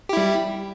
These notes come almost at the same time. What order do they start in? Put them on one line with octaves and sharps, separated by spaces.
G4 E4 G3